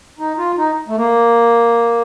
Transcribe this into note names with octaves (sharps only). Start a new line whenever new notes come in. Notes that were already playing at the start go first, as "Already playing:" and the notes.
D#4
F4
D#4
A3
A#3